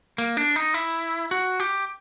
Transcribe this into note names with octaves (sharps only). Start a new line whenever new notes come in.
A#3
D4
D#4
E4
F#4
G4